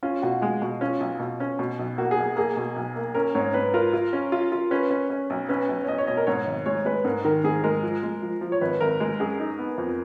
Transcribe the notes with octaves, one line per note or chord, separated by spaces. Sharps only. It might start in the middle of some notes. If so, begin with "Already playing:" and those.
C#4 F4
B2 F#4
G#3 G#4
B2
C#4 F4
B1
B2
C#4
B2
B1
A#3 F#4
G#4
B1
A#3 G#4
B2
B1
A#3
C#4 A#4
G#2 C#5
G#2 B4
F4 A#4
F4
C#4
F4
F4
C#4 B4
C#4
C#4
B1
C#4 B4
B1
C#5
B1 D#5
C#5
B2 D#5
A#4
G#2 C#5
G#1
G#3 C#5
G#3 B4
G#2 A#4
D#3 A#4
G#2 G#4
G#3 A#4
F3
G#3
F3
F3
C#5
G#1 B4
G#1 A#4
G#3
F#2 G#4
D#4
B3
F2